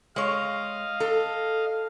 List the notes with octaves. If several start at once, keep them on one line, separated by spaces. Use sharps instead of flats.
G#3 C#5 D#5 F5
A4